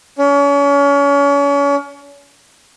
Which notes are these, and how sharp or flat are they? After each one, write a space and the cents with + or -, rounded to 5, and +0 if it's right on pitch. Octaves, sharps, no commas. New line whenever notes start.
C#4 +35